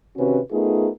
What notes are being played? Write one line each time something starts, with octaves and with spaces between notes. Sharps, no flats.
C3 D#3 C4 C#4 F#4 B4
A3 B3 D#4 F4 G#4 A#4